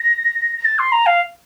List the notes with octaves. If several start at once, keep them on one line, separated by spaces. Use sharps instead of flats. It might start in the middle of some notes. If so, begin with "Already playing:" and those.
Already playing: A#6
A#6
A6
C6
A#5
F5